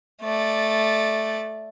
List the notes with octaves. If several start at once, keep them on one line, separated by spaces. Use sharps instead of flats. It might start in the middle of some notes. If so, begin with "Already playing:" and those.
A3 D5